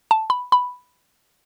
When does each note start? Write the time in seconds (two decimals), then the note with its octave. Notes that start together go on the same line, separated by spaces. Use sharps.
0.11 A5
0.30 B5
0.52 B5